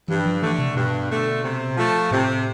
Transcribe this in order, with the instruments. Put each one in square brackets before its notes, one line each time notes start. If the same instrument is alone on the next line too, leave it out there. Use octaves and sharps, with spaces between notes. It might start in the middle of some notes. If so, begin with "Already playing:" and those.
[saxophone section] G2 [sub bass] E3
[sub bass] F3
[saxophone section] D3 A3 [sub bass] E3
[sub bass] C3
[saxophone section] G2 [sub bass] B2
[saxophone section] D3 A3
C3
F3 A3
[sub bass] A2 [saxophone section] C3